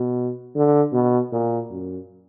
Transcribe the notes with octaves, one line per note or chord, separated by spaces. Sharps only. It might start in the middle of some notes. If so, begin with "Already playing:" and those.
Already playing: B2
D3
B2
A#2
F#2